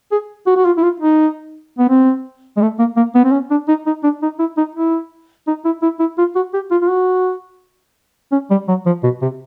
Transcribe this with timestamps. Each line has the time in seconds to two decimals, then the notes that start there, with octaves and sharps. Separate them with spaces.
0.12 G#4
0.47 F#4
0.57 F#4
0.66 F4
0.78 E4
0.83 F4
1.00 D#4
1.79 B3
1.90 C4
2.57 G#3
2.62 A3
2.79 A#3
2.97 A#3
3.15 B3
3.24 C4
3.32 C#4
3.51 D4
3.68 D#4
3.87 D#4
4.04 D4
4.22 D#4
4.39 E4
4.57 D#4
4.75 E4
5.47 D#4
5.65 E4
5.82 E4
6.00 E4
6.18 F4
6.35 F#4
6.54 G4
6.71 F4
6.82 F4
6.90 F#4
8.32 C#4
8.51 G3
8.68 F#3
8.86 F3
9.03 B2
9.22 C3